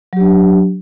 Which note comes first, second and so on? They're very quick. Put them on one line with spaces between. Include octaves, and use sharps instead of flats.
F#3 G4 D4